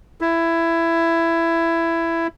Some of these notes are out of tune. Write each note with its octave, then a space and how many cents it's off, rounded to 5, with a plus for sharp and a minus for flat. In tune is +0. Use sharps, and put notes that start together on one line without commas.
E4 +15